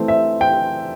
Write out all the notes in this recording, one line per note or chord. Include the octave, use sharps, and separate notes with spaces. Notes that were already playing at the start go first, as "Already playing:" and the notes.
Already playing: E3 A3 C4
E5
G5